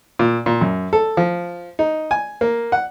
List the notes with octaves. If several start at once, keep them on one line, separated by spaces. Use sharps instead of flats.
A#2
A#2
F#2
A4
F3
D#4
G#5
A#3
F#5